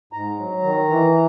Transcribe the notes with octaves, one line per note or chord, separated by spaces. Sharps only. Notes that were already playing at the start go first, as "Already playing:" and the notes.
G#2 A#5
F#3
D#3
E3